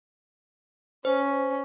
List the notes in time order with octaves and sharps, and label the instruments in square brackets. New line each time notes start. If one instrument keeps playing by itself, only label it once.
[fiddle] C#4 [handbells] C5